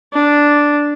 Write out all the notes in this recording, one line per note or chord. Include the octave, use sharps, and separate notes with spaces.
D4